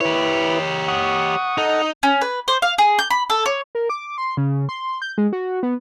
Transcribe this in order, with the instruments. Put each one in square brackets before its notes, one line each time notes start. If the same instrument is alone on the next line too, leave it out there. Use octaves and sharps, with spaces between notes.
[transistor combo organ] E4 B4 [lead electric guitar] G4 C#5
[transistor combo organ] F#5 C#6 D#6
[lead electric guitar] D#4 [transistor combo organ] A4 D#5 F#5
[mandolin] C#4
B4
C5
F5
G#4
G6
B5
A4
C#5
[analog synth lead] A#4
D6
C6
C#3
C6
G6
G#3
F#4
B3